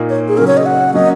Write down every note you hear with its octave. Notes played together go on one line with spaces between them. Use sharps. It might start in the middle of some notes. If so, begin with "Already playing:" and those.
Already playing: A#2 A#3 D#4
C#5
G#4
C#3 F#3 C#4 A#4
C#5
D#5
F#5
F#3 A#3 C#4 D#5